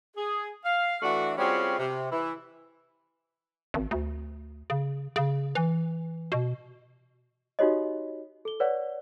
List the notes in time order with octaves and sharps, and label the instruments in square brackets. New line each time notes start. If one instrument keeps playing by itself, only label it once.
[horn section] G#4
F5
E3 A3 D4 F#4
G3 C4 C#4 F4 F#4 G#4
C3
E3 E4
[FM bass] G#1
D2
C#3
C#3
E3
B2
[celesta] D#4 F#4 G4 C#5 D#5
A4 G7
B4 C#5 D5 F#5